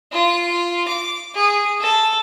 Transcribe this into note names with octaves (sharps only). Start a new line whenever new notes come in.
F4
D6
G#4
A4